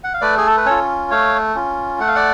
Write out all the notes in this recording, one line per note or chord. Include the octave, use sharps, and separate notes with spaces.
F#5
F5
A3 B4 D5
G#4
A4
B4
C#4 F4 A4 C#5
A3 C#5 F5
C#4 F4
A3 F#5
F5
D5 F#5